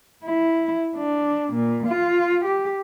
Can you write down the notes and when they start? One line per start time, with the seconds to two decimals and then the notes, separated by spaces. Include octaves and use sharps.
0.25 E4
0.96 D4
1.54 A#2
1.88 F4
2.45 G4